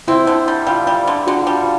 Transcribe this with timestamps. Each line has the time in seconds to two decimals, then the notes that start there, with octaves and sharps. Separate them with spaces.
0.07 C4 E4
0.27 D3
0.48 G3
0.67 G3 F4
0.87 G3
1.08 D3
1.27 D3 F#4
1.41 F4
1.47 G3
1.57 F4